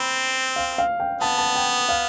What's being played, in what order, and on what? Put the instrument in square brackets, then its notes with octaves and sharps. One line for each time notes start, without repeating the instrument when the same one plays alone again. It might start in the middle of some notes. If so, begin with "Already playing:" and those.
Already playing: [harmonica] C4 [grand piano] B5
[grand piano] F5
F5
G5
[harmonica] B3 [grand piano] A5
[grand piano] A5
G5
F5